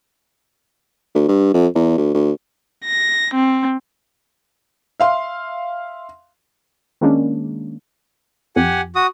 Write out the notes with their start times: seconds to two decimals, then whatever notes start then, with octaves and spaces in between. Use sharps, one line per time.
1.15 D2
1.28 G2
1.54 F2
1.75 E2
1.97 D2
2.14 D2
2.85 A#6
3.34 C4
5.00 E5 F5 C6
7.01 D#3 G#3 A#3 C#4 D4
8.56 F2 G4 F#5 G#5
8.95 F#4 D#6